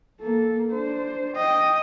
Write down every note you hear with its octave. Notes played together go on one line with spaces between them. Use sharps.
A#3 A4
D4 C5
D#5 G5